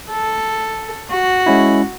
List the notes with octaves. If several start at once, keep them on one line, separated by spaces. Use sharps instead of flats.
A4
F#4
G#3 C#4 E4